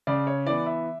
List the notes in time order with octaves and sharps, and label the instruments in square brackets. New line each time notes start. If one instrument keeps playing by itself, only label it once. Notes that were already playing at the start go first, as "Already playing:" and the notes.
[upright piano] C#3 D5
C#5
E3 B3 D5
E5